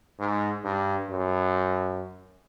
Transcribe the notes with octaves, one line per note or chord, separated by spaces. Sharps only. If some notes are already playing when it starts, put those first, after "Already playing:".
G#2
G2
F#2